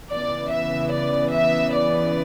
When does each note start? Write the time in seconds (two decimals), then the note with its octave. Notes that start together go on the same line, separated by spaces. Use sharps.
0.11 C#3 E3 B3 D5
0.52 E5
0.93 D5
1.33 E5
1.74 D5